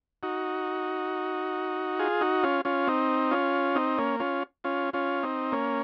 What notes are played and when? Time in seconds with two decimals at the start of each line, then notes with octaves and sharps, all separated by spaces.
0.23 D#4 F#4
1.99 F4 G#4
2.21 D#4 F#4
2.43 C#4 F4
2.65 C#4 F4
2.87 C4 D#4
3.31 C#4 F4
3.75 C4 D#4
3.98 A#3 C#4
4.20 C#4 F4
4.64 C#4 F4
4.93 C#4 F4
5.23 C4 D#4
5.52 A#3 C#4